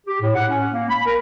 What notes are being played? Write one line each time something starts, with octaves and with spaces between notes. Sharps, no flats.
G4
A2
F#5
C#4
A#3
B5
A#4